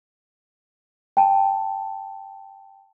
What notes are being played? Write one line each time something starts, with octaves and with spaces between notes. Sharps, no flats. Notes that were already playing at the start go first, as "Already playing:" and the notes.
G5 A5